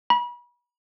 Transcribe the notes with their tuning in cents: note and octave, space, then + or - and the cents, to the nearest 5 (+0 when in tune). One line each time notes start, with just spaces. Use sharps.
B5 -35